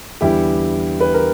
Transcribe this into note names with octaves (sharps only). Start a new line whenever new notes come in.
E2 D3 G3 E4 G4
B4
A#4